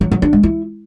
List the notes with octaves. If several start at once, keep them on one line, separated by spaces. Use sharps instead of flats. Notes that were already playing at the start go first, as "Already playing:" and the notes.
F#3
F#3
D4
G#3
E4